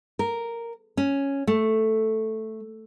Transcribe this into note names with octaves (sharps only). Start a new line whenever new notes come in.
A#4
C#4
A3